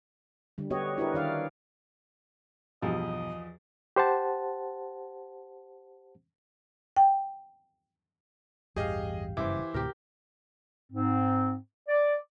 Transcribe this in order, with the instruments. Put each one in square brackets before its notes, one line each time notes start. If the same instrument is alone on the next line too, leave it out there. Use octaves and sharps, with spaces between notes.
[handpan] D3 G3
B3 F#4 G4 C#5 D#5
D4 E4 F#4 G4 A#4 B4
D#3 D5 F5
[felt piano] B1 G2 [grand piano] E2 F3 [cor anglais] D#5
[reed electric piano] G4 C5 F#5 A5
[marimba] G5
[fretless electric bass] A1 E2 G2 [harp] G4 F5 [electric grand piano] G#4 D#5
[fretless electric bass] F#1 G2 C#3 [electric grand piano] E3 [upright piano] E4 C5 [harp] D6
[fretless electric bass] D2 A2 C3 [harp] G4 A#4
[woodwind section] G#2 C4
D5